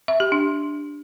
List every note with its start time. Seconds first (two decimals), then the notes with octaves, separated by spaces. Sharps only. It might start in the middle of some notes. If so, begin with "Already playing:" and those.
0.08 E5
0.20 G4
0.32 D4